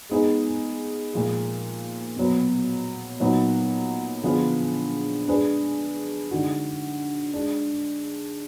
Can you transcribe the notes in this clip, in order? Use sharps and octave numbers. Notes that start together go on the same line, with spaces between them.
G#3 B3 D#4 G#4
A#2 F3 G#3
B2 F#3 B3
A#2 F#3 B3 D#4 F#4
D3 F3 B3 F4 G#4
G#3 D4 G#4 B4
D3 G#3 D#4 F#4
G#3 D4 G#4